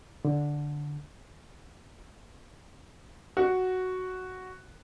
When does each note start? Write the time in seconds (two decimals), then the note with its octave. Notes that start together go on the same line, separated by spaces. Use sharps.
0.25 D3
3.37 F#4